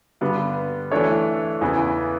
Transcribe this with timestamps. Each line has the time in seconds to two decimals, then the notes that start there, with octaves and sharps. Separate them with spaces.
0.21 G2 D3 G3 B3
0.92 E3 A3 D4 A4 C#5
1.61 E2 C#3 E3 B3